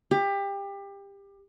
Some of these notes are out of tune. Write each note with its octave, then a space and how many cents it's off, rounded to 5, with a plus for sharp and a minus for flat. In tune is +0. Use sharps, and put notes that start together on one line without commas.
G4 +25